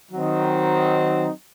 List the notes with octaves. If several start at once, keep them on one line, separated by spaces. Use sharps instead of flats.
D#3 F#3 C4 D#4